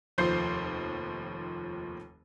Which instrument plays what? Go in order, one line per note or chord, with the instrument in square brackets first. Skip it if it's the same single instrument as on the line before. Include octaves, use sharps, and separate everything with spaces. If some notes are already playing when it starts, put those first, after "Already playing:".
[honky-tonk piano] F1 D#2 F3 C5 G6 C7